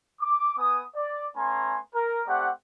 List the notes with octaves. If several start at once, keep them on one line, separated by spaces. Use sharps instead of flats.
D6
B3 B4 G#5 D#6
D5
A3 B3 C#4 G#5 A#5 C6
A#4
A3 C4 G4 D5 F#5